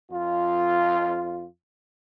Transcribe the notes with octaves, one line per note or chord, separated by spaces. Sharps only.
F2 F4